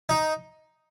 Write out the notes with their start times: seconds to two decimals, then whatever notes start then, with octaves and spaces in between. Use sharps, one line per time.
0.09 D#4